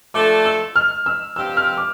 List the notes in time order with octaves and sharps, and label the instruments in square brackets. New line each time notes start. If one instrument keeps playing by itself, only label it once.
[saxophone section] F3 A3 D4 A4 [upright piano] D6
[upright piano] E6
F6
E6
[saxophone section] G2 F3 C4 G4 [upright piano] E6
[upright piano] F6
D6